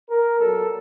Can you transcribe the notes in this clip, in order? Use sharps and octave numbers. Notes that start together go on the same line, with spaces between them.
A#4
A#2 F#3 B3 A4